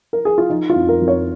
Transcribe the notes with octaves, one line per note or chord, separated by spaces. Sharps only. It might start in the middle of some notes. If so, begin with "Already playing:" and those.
A#4
G#4
F4
F3 D#4
F4
F2
A#4
F2
C#5